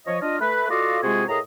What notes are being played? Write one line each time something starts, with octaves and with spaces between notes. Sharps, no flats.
F3 C#5 D#5
D4 F4 D#5
A3 B4
F4 F#4 A4 D5 D#5 F5
C3 G#3 F4 F#4 G#4
A2 G#4 A#4 D#5 A#5